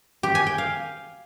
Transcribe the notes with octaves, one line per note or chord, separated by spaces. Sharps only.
G4
G#5
G5
F5